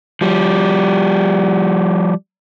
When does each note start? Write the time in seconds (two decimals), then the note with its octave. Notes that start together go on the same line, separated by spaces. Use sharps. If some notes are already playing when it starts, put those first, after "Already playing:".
0.21 F3 G3